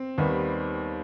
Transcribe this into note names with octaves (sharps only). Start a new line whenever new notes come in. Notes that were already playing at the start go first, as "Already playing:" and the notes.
Already playing: C4
D#2 D#3 G3 B3